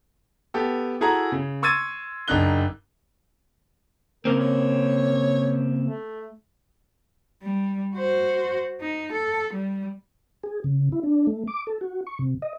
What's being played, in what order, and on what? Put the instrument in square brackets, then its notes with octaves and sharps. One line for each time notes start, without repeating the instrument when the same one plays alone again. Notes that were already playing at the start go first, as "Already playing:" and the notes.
[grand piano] B3 G4 A4
E4 F#4 G#4 A4 A#5
C#3
C6 C#6 E6 G#6 A6 D#7
F#1 D4 D#4 F#6 G7
[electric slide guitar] C#3 A#3 C4 [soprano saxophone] A#4
[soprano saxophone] C#5
A3
[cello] G3
F#4 C5
D#4
A4
G3
[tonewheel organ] G#4
C#3
E4
D4
A3
D6
A4
F#4
C#6
C3
D#5